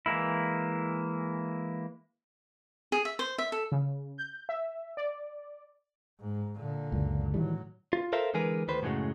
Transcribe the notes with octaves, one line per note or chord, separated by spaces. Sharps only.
E3 G#3 A#3 E4
G#4
E5
C5
E5
A4
C#3
G6
E5
D5
G#2
A#2 D3
C#2 F#2
A2 D#3 E3 F#3 G3
F4
A4 A#4 C5 E5 F5
D3 E3 G#3 G#4 A#4 B4
D2 D#3 B4 C5
F#2 A2 C#3 F#3 G#3